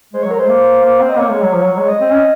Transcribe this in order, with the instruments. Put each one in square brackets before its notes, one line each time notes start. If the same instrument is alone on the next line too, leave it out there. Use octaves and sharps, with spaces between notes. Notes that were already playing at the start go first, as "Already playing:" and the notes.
[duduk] G#3 [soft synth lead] C5
[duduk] F#3 [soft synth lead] C#5
[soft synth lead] A#4
[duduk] G#3 [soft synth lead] C5
[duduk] A#3
A#3
C4
[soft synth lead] D#5
[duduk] A#3 [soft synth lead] C#5
[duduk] G#3
F#3
F3
F#3
G#3
[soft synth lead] D#5
[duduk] C4
C#4